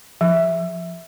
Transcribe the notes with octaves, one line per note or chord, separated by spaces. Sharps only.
F3